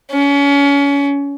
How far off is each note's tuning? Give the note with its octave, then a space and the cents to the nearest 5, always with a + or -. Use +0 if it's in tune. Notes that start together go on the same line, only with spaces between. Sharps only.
C#4 +30